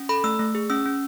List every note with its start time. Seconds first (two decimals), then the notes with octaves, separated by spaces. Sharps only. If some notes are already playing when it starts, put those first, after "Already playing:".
Already playing: C#4
0.09 A4 B5
0.24 A3 E6
0.39 A3
0.55 G#4
0.70 C#4 E6
0.85 C#4